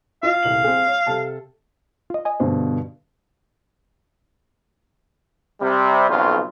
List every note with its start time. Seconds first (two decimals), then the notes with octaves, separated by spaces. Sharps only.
0.23 F4 D#5 F5
0.43 D#1 C2 F#7
0.64 C4 G#4
0.87 C#5
1.06 C3 A4 A5
2.10 F4 D#5
2.25 D#5 G#5
2.40 G2 B2 D3 C5
5.62 C3 G3
6.10 B1 F2 C#3 F4